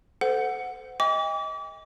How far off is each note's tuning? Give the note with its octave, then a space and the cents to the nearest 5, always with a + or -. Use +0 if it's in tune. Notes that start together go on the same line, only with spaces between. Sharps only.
A4 +0 C5 -30 F#5 -5
D#5 +25 G5 +40 D6 -35